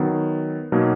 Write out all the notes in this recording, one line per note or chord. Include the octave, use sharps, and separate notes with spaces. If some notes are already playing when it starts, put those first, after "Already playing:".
Already playing: D#3 F#3 B3
B2 F#3 A#3 D#4